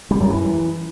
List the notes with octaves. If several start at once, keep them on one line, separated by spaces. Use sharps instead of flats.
G3
F#2
E3